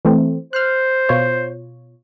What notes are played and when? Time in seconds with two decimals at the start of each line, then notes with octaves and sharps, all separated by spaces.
0.05 E3 A3 C4
0.53 C5 F6 F#6
1.09 B2 F4 C#5